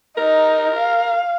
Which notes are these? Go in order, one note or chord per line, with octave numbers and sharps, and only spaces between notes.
D#4 A#4
F5